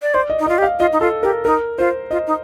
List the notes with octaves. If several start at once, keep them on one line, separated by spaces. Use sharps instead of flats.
D5
C5 D5
D#5
D#4
F4 D#5
G4
F5
F4 D#5
D#4
F4 A4
G4 A#4
D#4 A#4
F4 C5
F4 D#5
D#4